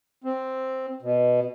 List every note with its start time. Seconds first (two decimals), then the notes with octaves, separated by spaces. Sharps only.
0.24 C4
1.02 B2